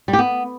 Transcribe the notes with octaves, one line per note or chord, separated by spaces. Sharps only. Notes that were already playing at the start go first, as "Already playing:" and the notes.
G3
G4
B3